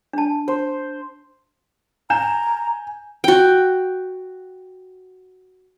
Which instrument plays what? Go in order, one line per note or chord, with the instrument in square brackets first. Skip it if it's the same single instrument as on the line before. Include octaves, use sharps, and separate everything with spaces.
[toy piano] D4 A5
[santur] C5
[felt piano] G#5 G6 E7 [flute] A#5
[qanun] F#4 G5